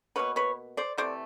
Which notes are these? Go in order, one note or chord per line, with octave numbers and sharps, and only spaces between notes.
B2 G3 A#3 B4 C#5
B4 C#5
C5 D5
C3 E3 A3 C5 D5